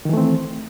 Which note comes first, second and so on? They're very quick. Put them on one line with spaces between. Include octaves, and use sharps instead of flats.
D#3 E3 A3 C4